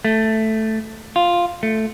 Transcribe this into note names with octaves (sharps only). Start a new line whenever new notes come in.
A3
F4
A3